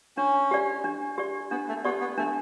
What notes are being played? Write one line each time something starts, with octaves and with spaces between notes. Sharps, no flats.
C#4 D4
G4 D5
D4
G4 D5
B3 D4
A3
B3 G4 D5
B3
A3 D4